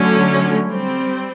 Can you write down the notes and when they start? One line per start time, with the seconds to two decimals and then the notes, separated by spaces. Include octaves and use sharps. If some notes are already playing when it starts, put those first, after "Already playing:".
Already playing: D3 F#3 A3 C#4
0.68 G3 C4